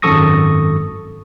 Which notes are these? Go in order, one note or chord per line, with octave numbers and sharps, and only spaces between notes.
G#1 F#2 A4 C#6 D#6 A#6